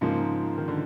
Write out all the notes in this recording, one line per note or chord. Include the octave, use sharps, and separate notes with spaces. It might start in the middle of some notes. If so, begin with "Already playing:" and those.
G#2 C#3 F3 A#3
D#3
D3